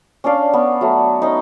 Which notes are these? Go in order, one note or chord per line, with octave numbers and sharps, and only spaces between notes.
C#4 D4 D5 F5
B3
F#3 A3
C#4 D#4